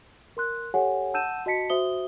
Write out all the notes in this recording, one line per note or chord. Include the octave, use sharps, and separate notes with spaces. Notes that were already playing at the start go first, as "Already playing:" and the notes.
A#4 C6 F#6
G4 A4 C#5 F#5 G#5
F#5 A5 E6 G6 D#7 E7
F#4 D#5 A5 B6 C#7
F#4 C5 E5 D#6 G7